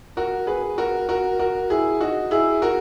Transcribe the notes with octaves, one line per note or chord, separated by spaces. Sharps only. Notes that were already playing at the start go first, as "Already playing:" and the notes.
F#4 A#4
G#4 B4
F#4 A#4
F#4 A#4
F#4 A#4
E4 G#4
D#4 F#4
E4 G#4
F#4 A#4